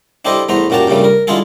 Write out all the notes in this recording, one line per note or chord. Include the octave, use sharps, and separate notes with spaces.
D4 E4 G4 A4 C5 D#5
E2 A3 B3 C5 A#5
F#2 A#2 F#4 G4 A5 A#5
G2 A#2 C#3 G3 A3
A#4
D3 G#3 E4 F4 G#4 A4